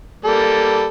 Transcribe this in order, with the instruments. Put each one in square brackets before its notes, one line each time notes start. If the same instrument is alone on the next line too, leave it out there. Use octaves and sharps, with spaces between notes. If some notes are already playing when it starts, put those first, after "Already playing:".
[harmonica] G3 A#3 A4